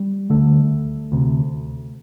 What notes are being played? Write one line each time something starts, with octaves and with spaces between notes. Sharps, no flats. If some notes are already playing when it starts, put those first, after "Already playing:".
Already playing: G3
D2 D3 A3
D2 C3